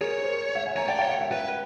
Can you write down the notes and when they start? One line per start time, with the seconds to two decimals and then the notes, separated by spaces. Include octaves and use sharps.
0.01 G#4 A#4 C#5
0.22 A#4 C5
0.55 E5 F#5
0.66 F#5 G#5
0.76 C#5 G#5 A#5
0.88 D5 G5 A5
0.99 C#5 F5 G5
1.09 E5 F#5
1.21 E5 F#5
1.32 B4